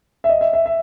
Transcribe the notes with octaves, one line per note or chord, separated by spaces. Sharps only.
E5
D#5
E5
E5
E5